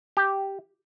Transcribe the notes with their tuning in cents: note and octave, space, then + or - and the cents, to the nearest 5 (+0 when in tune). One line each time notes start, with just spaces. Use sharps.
G4 -5